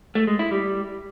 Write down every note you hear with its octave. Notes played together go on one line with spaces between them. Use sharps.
A3
G#3
E4
G3